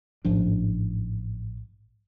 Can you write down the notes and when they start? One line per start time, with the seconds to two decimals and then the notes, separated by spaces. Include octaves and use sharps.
0.25 A1 G#2 F3 D4